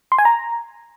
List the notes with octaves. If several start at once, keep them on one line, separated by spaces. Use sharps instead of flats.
C6
G#5
A#5